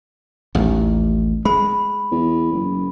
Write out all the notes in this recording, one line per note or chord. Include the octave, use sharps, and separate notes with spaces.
A1 D#2
G#3 B5
E2
F#1